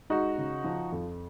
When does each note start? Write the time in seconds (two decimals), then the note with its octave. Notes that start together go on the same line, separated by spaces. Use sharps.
0.10 G#3 D#4 F#4
0.38 C#3
0.64 F3
0.92 F2